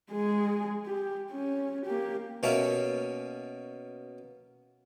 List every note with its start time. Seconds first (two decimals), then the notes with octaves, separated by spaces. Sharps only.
0.12 G#3 G#4
0.86 G4
1.31 C#4
1.86 A#3 G4
2.43 B2 A#3 C#4 E5